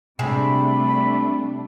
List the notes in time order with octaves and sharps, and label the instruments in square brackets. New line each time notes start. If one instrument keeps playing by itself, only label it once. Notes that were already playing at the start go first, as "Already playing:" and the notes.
[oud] C3 G#4 [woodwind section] F3 C4 B5 [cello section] G3 A3 D4